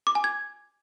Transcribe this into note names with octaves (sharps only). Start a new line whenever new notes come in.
D6
G#5
G#6